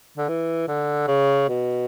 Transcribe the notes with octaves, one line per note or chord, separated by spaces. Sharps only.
D3
E3
D3
C#3
B2